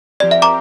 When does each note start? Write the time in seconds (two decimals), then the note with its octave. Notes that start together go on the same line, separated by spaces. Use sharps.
0.20 F3 C4 G4 A#4 D5
0.31 E5
0.42 A#5 D6